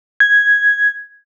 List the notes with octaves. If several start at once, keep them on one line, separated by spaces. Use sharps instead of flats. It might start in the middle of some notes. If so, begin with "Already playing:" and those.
G#6